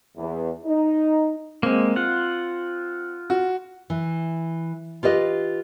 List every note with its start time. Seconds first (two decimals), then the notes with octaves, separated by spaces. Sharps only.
0.16 E2
0.65 D#4
1.63 G#3 A#3 C4
1.96 F4 F#5
3.30 F#4
3.90 E3
5.03 F4 G4 B4 D#5